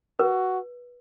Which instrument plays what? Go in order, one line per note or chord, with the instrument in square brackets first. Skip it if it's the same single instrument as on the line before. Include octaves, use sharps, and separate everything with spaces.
[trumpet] F#4 [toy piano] B4